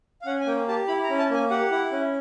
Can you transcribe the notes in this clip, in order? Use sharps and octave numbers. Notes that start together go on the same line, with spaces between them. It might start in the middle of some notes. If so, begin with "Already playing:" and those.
F5
C#4 F#5
G#5
A#3 G5
G4 A5
E4 B5
A#5
C#4
A5
A#3 G#5
G4 F#5
E4
C#4